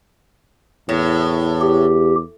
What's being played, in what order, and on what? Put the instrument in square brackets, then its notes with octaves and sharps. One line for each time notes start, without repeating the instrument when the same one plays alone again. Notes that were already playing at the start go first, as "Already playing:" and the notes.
[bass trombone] E2 [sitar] A2
[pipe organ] G4